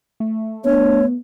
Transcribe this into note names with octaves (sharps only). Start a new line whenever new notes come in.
A3
B3 D4 C#5